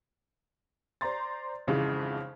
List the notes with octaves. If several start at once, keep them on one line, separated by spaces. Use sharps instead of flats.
C5 D5 A#5 C6 A6
G#1 F2 C#3 E3 G#3